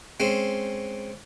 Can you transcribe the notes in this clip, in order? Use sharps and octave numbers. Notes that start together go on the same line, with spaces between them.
G#3 C4 C#4